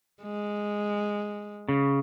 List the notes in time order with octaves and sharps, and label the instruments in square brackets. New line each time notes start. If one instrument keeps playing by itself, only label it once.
[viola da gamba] G#3
[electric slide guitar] C#3